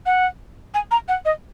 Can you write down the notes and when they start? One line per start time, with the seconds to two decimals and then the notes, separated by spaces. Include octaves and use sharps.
0.06 F#5
0.74 G#5
0.91 A#5
1.08 F#5
1.25 D#5